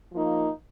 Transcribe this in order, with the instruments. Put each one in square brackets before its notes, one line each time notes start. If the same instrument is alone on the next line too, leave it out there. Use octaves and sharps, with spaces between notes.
[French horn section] F3 A#3 D#4